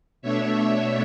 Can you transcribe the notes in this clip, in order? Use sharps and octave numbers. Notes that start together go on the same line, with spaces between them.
B2 A3 D4 C#5 E5
C#5 E5